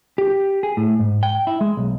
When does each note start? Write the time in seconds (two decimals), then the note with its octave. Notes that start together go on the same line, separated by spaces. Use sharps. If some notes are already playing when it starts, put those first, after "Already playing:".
0.18 G4
0.63 G#4
0.77 A2
0.99 G#2
1.23 G5
1.47 E4
1.61 G#3
1.77 B1